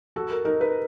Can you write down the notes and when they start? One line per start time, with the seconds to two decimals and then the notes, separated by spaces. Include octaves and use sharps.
0.16 F#4 A4
0.30 A#4
0.45 D#4 A#4
0.61 B4